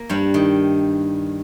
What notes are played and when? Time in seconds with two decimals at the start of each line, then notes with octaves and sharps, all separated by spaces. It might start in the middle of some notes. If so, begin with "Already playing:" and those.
Already playing: A#3
0.10 G2 G3
0.34 D#3